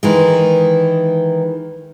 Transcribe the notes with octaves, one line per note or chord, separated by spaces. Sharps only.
D#3 E3 G#3